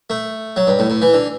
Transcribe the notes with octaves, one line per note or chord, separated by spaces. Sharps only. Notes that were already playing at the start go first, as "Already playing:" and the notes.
A3
F#3
G2
A2
A2
E3
D3